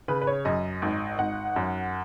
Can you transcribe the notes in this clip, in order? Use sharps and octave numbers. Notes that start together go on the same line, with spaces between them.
C#3 B4
B4
C#5
F#2 D#5
G#1
G#1 F#5
F#2